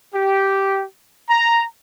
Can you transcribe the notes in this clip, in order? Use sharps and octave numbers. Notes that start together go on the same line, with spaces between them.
G4
A#5